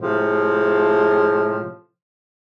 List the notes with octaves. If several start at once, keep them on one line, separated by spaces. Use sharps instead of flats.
A2 C3 F3 G#3